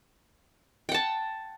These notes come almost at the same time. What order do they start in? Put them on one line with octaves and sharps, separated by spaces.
G5 F#5 A5